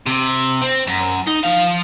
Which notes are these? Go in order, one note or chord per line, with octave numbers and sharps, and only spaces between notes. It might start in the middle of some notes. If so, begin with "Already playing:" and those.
C3
C4
F#2
D#4
F3 F5